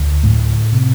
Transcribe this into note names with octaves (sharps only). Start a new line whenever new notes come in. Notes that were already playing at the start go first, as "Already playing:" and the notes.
Already playing: D2 D3
A2 A3
C3